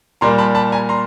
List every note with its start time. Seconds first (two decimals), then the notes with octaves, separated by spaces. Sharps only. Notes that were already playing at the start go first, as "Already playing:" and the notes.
0.21 A#2 G3 A#3 A#5 C6
0.38 A5 B5
0.55 A5 B5
0.72 G#5 A#5
0.89 A#5 C6